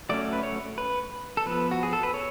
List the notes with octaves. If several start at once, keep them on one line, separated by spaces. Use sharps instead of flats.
F#3 A3 C#4 D5
B4
C#5
B4
A4
F3 B3 B4
F#4
G#4
A4
B4
C#5